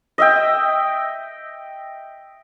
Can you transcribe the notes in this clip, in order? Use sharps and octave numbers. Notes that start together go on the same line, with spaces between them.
D#5 E5 G5